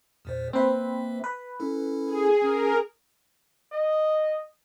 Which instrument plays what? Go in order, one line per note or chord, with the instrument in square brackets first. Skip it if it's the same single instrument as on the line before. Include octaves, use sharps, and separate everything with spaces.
[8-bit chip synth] E2 A#2 C5
[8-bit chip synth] A#3 E5 [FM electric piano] C4 B4
[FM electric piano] B4
[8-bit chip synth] C#4 E4 A4
[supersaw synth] G#4
[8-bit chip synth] C#4 [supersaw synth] A#4
[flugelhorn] D#5